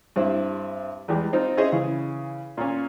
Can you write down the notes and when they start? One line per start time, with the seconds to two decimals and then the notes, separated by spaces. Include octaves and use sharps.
0.16 G2 C4 E4
1.08 E2 E3 G3 G#3 G4
1.33 C4 D#4 F4
1.57 C#4 E4 G#4 C5 D#5
1.72 C#3 E3
2.57 A#2 C#4